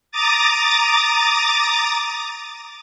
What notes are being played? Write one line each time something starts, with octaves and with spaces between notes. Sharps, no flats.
A#5 D6 D#6 A6